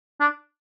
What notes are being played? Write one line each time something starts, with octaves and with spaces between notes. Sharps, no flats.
D4